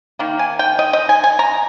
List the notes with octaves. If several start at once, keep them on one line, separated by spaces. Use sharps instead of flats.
D#3 A#3
G#5
G5
D#5
D#5
G#5
G#5
A#5